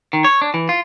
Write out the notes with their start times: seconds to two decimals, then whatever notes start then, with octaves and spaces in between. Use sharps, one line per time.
0.13 D#3
0.24 C#5
0.42 D4
0.54 E3
0.69 F4